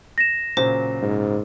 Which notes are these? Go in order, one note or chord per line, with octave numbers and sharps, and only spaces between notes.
A#6 E7
A#2 C#3 F#3 C5
G#2